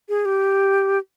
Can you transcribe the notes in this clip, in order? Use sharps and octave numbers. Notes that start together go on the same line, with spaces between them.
G#4
G4